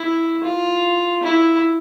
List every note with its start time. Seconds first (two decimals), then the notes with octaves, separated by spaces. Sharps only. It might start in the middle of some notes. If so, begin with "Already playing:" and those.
Already playing: E4
0.43 F4
1.23 E4